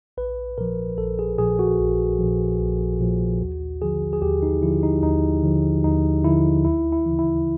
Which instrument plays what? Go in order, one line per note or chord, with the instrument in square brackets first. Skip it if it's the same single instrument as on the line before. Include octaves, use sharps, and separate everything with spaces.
[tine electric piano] A#1 B4
A#2 F3 A#4
A#1 A4
G#4
A#2 F3 G#4
F#4
A#1
A#2 F3
A#1
A#2 F3
D#2
D3 F3 G#4
G#4
D#2 G4
D#4
D3 F3 E4
D#4
D#2 D#4
D3 F3
D#2 D#4
D3 F3 E4
D2 E4
E4
C#3 E3
E4